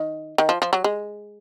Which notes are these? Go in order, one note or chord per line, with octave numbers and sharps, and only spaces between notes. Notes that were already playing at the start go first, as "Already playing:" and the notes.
Already playing: D#3
D#3
F3
F3
F#3
G#3